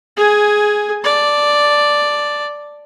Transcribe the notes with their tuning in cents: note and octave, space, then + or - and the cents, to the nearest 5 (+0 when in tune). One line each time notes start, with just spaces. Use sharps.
G#4 +10 G#5 +0
D5 +0 A5 +0